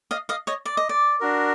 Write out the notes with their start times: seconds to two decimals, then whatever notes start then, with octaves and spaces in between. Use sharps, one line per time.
0.11 D#5 F5
0.29 D#5 F5
0.47 C#5 D#5
0.65 D5
0.77 D#5
0.89 D5
1.21 D4 F#4 A#4